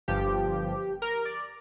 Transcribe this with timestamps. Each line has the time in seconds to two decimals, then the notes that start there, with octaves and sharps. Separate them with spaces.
0.08 G1 G2 F3 G4
1.02 A#4
1.25 D5